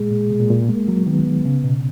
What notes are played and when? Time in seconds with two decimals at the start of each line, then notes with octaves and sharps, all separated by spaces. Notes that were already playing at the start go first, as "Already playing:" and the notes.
Already playing: A#2 G#3
0.11 A#2
0.30 B2
0.40 A#2
0.50 A#2
0.69 G#3 A#3
0.88 F#3
1.06 D#3 B3
1.45 C#3
1.64 B2